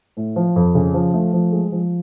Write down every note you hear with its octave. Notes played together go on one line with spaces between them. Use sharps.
A2
F3
F2
C#3
F3
A3
F3
G#3
F3